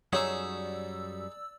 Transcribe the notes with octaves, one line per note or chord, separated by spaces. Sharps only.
F#2 G3 D#4 F#4 G#4 C#5 D5 E6